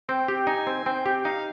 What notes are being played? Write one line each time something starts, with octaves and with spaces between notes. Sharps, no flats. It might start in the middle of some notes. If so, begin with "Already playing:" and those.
C4 G5
G4
D#4 G#5
C4
C4 G5
G4 G5
D#4 F5